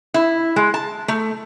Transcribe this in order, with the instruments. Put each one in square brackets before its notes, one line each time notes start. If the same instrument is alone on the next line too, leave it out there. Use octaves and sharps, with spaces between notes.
[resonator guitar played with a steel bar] E4
G#3
A5
A3